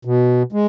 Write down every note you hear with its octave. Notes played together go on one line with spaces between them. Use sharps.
B2
G#3